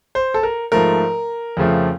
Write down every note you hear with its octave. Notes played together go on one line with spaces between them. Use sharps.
C5
A4
A#4
G#2 F3 A3 A#4
F2 C#3 F3 A3